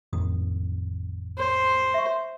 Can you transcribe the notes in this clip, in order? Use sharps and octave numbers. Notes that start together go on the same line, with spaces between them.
A1 F2 D#3 D#6
C5
E5 C#6